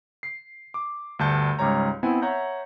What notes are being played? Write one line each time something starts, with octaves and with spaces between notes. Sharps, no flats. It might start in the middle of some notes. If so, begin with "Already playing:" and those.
C7
D6
D2 G2 A5 G6 C#7
C#2 G#2 G3 C#5 A#5
B3 C4 E4 F#5 G#5
C#5 E5 F#5 A#5 G6